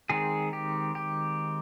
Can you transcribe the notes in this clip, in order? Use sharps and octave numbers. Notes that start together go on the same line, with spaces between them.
D#3 G#3 C4 G#4
G4
G4